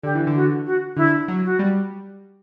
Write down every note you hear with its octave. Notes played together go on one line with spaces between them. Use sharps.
D3 G4
E3
D3
F#4
F#4
D3 E4
F#3
F#4
G3